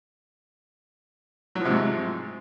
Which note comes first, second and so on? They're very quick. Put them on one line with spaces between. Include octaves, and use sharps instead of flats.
F#3 F3 C3 G#2